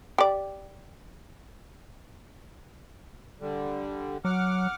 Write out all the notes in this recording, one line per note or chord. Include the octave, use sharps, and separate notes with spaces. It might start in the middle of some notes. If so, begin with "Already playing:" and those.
G4 D5
D3 G3
F#3 F#5 D6 F6